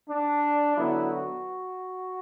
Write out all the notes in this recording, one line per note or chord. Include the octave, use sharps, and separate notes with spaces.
D4
D3 F#3 B3 E4
F#4